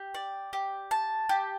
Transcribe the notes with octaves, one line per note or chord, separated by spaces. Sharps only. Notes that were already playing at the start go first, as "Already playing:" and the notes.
Already playing: G4
D5
G4
A5
G4